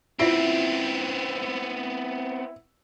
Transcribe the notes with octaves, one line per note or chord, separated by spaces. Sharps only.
B3 C4 E4 F4 E5